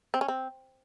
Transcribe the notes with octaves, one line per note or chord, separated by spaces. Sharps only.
C4
C#4
C4